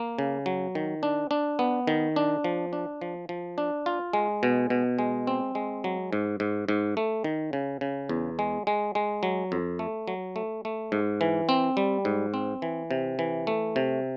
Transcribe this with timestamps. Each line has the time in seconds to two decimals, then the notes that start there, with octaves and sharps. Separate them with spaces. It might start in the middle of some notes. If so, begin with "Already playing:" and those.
Already playing: A#3
0.18 C#3
0.46 F#3
0.75 D#3
1.03 D4
1.31 D4
1.59 B3
1.87 D#3
2.16 D4
2.44 F3
2.73 D4
3.02 F3
3.29 F3
3.58 D4
3.86 F4
4.13 G#3
4.43 B2
4.70 B2
4.99 G#3
5.27 C4
5.55 G#3
5.84 F#3
6.13 G#2
6.40 G#2
6.68 G#2
6.97 A3
7.24 D#3
7.53 C#3
7.81 C#3
8.09 E2
8.39 G#3
8.67 G#3
8.95 G#3
9.23 F#3
9.52 F2
9.79 A3
10.08 F#3
10.36 A3
10.65 A3
10.92 G#2
11.21 E3
11.49 C4
11.77 G3
12.05 G#2
12.34 C4
12.62 E3
12.91 C3
13.19 E3
13.47 A3
13.76 C3